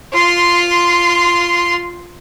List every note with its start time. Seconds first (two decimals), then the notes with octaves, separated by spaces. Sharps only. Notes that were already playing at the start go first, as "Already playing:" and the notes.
0.13 F4 C6